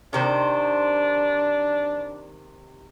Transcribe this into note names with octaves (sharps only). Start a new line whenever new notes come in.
C3 D#3 D4 C5